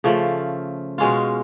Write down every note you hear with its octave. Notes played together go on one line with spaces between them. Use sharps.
C#3 F3 A3
B2 G#3 C#4 F4